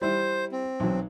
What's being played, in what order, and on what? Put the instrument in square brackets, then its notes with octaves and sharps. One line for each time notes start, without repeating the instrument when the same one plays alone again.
[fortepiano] G3 E4 [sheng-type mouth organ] C5
[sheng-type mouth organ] C4
[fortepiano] B1 F#3